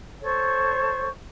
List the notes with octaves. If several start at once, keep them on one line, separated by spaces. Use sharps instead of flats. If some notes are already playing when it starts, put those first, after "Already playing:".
A4 C5 C#5 C#6